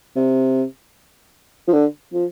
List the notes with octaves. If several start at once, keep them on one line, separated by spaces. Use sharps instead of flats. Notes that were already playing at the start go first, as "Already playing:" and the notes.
C3
F3
D3
F3